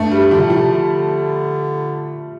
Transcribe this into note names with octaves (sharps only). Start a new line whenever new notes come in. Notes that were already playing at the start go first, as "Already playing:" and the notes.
Already playing: G2 A3
G3
D3 F3
C3
A2
C3 F3
D3